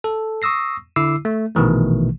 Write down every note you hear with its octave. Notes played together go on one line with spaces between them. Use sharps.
A4
C#6 D#6 E6 A#6 C7
D3 E4 D6 E6 C7
A3
A#1 B2 D#3 E3 A3